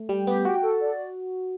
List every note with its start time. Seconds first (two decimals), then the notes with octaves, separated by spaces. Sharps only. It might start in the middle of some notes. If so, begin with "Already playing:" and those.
Already playing: A3
0.09 G3 G5
0.27 B3 G4
0.45 F#4 G5
0.63 A4
0.81 D5